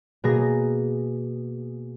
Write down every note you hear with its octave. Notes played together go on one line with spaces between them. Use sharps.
B2 A#3 G#4 A#6